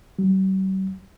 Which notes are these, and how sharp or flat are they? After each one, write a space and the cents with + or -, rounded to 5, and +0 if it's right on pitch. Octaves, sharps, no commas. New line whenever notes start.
G3 -45